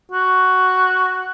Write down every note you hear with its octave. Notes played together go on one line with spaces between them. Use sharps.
F#4